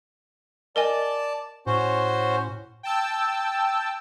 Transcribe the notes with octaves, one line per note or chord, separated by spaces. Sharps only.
A#4 D5 D#5 G#5 A5
A2 C#4 F#4 C5
G5 A5 E6